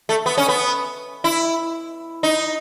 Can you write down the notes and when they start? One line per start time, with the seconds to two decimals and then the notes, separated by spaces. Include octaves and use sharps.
0.09 A3
0.26 B3
0.38 C#4
0.48 B3
1.24 E4
2.23 D#4